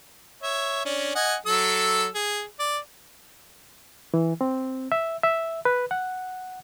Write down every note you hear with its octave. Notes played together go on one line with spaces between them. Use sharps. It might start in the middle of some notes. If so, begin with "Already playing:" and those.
C#5 E5
C#4 D4
D#5 F#5 G#5
F#3 A4 E6
G#4
D5
E3
C4
E5
E5
B4
F#5